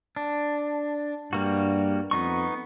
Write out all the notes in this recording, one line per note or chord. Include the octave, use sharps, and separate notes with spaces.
D4
G2 G3 A#3 F#4
F2 B3 D#4 C#6